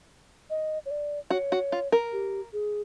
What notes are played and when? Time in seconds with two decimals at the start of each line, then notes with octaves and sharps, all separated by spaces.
0.50 D#5
0.86 C#5
0.91 D5
1.30 F#4 C#5
1.52 F#4
1.72 F4
1.92 A#4
2.12 G4
2.53 G#4